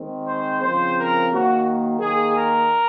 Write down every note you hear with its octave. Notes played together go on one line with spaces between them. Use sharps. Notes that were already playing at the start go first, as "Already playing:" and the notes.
Already playing: D#3 G#3 C4
C5
C#3 F3 C4 C5
A#4
D#3 F#3 A#3 F#4
D#3 A#3 G#4
A#4